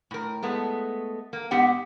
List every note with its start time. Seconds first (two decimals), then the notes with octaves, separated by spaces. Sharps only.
0.11 A2 A#4
0.43 G#3 A3 B3
1.33 A#3
1.51 G#2 B3 G4 E5 F#5